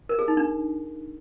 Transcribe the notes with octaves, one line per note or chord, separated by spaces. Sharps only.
A#4
G#4
D#4
D4